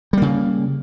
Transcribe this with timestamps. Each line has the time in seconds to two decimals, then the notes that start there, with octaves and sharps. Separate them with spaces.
0.13 G3
0.17 A#3
0.22 C#3